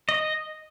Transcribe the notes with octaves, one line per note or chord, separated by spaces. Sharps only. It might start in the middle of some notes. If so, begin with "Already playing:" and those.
D#5